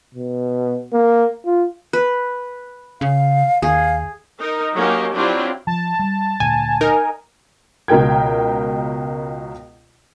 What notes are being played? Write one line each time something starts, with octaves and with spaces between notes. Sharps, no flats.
B2
A#3
F4
B4
C#3 F5
D#2 G#4 F5
D#4 A#4
F#3 A#3 C#4 D#4 G4
F#3 C4 D4 E4 F4 G4
F3 A5
G3
D2 A#2 G#5
D#4 A#4
C#2 B2 A#4 G5 G#6